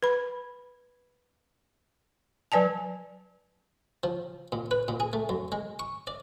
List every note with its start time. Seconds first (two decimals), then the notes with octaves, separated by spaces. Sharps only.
0.03 B4 B5
2.52 F#3 B4 D5 G#5 A5
4.04 F3
4.52 A#2
4.71 B4
4.88 A#2
5.00 G#4
5.13 A3
5.29 F#2
5.52 G#3
5.79 C#6
6.07 D5